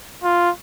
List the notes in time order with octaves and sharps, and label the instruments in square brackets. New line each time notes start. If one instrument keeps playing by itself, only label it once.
[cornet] F4